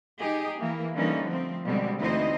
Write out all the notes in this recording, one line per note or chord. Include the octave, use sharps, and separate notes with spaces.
D#4 G4 G#4
E3 A#3
D3 E3 G3 A#3 C#4 D#4
F3 A3 C4
B2 D3 G3 G#3 C4
D2 E3 C4 D#4 C5 D#5